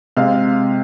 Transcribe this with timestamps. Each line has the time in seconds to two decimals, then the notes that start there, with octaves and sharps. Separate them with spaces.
0.17 C3 G#3 F5